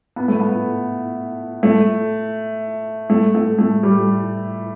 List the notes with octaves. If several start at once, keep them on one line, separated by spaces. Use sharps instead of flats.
B3
A3
B3
A3
A3
A3
A3
G3